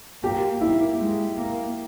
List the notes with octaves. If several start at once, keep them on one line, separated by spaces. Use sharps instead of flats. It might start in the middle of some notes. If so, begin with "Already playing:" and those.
A#3 G4
A#3 E4
G#3
A#3